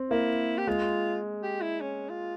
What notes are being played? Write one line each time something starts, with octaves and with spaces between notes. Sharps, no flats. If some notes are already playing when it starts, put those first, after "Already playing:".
Already playing: C4
A#3 E4
G4
G#3 F4
G4
E4
C#4
F4